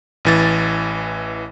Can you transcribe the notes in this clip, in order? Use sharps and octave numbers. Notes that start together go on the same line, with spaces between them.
A1 E3 A6